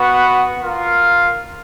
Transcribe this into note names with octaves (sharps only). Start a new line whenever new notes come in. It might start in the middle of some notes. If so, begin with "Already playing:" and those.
Already playing: B3 F#4 B4 F#5
F4 A#4 F5